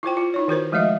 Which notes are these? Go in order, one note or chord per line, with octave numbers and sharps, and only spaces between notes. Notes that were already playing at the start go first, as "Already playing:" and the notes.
E4 F4 C5 G5
F4
D#4 E4 C#5
D#3 F#4 A#4 C5
F3 G#3 A3 F#4 D#5 E5